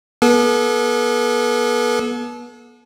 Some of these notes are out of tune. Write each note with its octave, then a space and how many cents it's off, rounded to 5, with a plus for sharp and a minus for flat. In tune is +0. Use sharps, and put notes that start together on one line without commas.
B3 -35 A4 -35